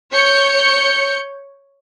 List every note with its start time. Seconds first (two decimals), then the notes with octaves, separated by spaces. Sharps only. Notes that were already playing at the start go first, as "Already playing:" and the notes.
0.13 C#5 G6 C#7